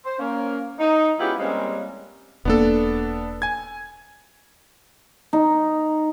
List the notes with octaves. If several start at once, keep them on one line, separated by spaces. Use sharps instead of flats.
C5
A#3 C#4
D#4
G#3 B3 C#4 E4 F4 G4
G3 G#3 A#3 C4 C#4
E1 A#3 B3 D4 A4
G#5 G#6
D#4